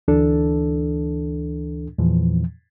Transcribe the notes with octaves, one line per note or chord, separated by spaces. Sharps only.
D2 E3 D4 A4
E2 A#2 E3 F3